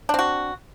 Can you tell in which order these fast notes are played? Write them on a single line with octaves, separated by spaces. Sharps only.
D4 C4 F#4